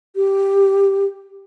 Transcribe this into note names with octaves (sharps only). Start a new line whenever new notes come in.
G4